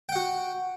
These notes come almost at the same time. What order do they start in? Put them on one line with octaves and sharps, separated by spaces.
G5 F#5 F#4